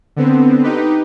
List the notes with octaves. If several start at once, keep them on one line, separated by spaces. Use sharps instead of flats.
D3 B3 C4
D#4 G4 B4